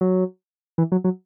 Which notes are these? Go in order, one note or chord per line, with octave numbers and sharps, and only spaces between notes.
F#3
E3
F#3
F#3